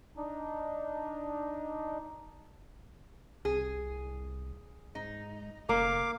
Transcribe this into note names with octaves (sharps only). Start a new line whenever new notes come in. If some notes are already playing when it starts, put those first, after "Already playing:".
D4 D#4
C2 G#4
G#2 D#4
F#1 A#3 F5 D6